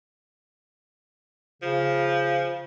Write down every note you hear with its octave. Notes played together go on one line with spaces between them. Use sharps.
C#3 F3